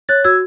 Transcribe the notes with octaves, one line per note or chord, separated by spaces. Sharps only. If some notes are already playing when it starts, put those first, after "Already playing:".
C#5 F#6 A6
F#4 E6 G#6